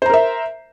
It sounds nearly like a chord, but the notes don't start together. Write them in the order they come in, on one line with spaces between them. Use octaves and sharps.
C5 A#5 A#4 E5